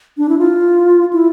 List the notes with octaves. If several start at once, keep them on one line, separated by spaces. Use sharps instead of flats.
D4
E4
F4
E4